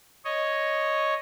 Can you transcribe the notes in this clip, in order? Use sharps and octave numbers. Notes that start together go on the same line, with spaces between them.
C#5 D#5